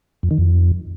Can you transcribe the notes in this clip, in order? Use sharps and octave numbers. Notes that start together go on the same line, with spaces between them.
F2
D#3
F2